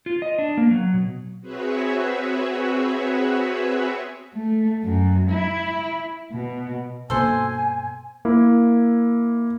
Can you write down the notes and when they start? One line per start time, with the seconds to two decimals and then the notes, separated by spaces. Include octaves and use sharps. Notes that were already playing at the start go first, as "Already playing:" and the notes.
0.06 F4
0.22 D#5
0.39 D4
0.57 A#3
0.71 F#3
0.93 B2
1.41 C4 F#4 G#4 B4 C#5 E5
4.35 A3
4.83 F#2
5.30 E4
6.31 B2
7.10 G2 B2 A#3 A4 C5 G#5
8.25 A#3 E4